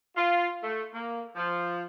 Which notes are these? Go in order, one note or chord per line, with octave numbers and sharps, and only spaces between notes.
F4
A3
A#3
F3